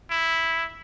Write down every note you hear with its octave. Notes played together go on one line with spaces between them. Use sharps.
E4